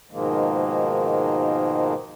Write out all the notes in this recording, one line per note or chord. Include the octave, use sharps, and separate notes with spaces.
G#2 B2 D#3 F3 G#3 A#3